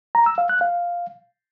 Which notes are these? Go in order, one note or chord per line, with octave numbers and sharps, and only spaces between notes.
A#5
E6
F5
F#6
F5